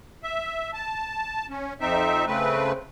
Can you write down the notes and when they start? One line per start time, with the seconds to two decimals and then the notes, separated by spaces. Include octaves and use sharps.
0.23 E5
0.73 A5
1.50 C#4
1.81 F2 C4 D#4 E5
2.27 C#3 A3 C4 B4